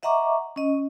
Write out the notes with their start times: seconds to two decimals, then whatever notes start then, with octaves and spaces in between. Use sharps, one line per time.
0.03 D#5 E5 F#5 A#5 C#6 D6
0.56 C#4 D#5